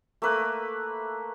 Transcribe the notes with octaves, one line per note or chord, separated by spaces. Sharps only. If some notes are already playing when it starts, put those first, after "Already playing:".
A3 A#3 B4